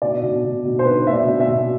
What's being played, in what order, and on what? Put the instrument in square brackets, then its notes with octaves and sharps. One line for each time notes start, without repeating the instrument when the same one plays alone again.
[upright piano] B2 D5
B2
B2
B2
C5
B2 B4
B2 E5
D5
B2
E5
B2